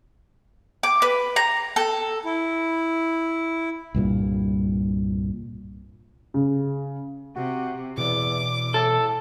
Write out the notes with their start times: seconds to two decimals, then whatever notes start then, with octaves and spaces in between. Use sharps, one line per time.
0.83 D6
1.02 B4
1.36 A#5
1.76 A4
2.24 E4
3.95 C2 G2 A#2
6.34 C#3
7.36 C3 F#4
7.98 E2 B2 E3 D5 D6
8.74 A2 A4